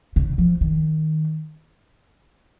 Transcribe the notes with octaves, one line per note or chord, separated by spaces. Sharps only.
C#3
F3
D#3